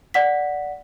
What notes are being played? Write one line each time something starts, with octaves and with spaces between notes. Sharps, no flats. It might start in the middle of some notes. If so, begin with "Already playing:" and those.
D5 F#5 B6